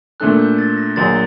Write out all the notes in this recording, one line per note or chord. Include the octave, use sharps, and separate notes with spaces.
A#2 A3 D4 A4 F#6
G6
A6
A#6
A#1 A#2 F#3 A6